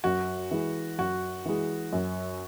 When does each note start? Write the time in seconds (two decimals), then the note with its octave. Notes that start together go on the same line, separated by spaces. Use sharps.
0.04 F#2 F#4
0.51 E3 G#3
0.98 F#2 F#4
1.45 E3 G#3
1.93 F#2